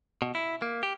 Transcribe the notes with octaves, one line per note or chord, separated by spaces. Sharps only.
B2
E4
A#3
G4